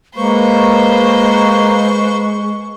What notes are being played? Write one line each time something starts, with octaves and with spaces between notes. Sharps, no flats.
G#3 A#3 B4 C5 C#6